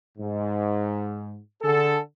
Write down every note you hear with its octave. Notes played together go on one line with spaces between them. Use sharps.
G#2
D3 G#4 A4